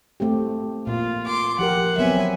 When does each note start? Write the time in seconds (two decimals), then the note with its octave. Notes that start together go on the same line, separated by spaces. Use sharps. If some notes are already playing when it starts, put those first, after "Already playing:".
0.20 A3 C4 G4
0.87 A#2 F4
1.26 C6 D6
1.59 F3 G4 A#4 F#5
1.98 F#3 B3 C4 E5 G#5